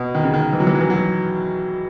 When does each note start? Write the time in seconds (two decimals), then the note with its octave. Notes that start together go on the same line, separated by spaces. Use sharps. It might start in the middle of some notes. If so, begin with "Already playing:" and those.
Already playing: B2
0.15 D#3
0.24 C#3
0.34 D#3
0.53 E3
0.60 F#3
0.67 E3
0.75 F#3
0.81 E3
0.90 F#3